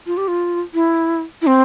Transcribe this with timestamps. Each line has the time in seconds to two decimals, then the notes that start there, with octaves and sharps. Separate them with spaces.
0.06 F4
0.17 G4
0.28 F4
0.74 E4
1.42 E4
1.47 C4